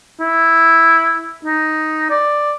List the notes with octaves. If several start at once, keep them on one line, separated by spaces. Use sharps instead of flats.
E4
D#4
D5